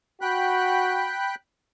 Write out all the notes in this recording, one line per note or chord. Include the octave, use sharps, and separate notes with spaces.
F#4 G5 B5 F#6